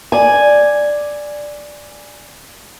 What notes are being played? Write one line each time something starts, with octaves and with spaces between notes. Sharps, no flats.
D5 G#5